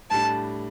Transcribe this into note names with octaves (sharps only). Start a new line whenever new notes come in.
A2 G3 D4 A5